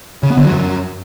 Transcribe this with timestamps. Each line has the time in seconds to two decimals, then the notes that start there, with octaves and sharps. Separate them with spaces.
0.23 C#3
0.30 B3
0.37 D3
0.44 F#3
0.52 F#2